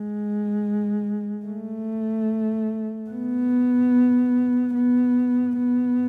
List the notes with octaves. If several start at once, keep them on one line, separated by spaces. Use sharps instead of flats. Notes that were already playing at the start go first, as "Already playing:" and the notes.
Already playing: G#3
A3
B3
B3
B3